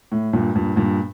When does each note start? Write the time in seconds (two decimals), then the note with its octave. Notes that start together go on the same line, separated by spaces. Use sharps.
0.12 A2
0.33 G2 A#2
0.55 G2 A#2
0.76 G2 A#2